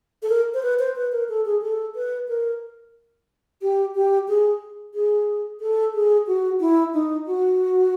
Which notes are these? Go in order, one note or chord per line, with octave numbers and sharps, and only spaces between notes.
A4
A#4
C5
B4
C5
B4
A#4
A4
G#4
A4
B4
A#4
G4
G4
G#4
G#4
A4
G#4
F#4
E4
D#4
F#4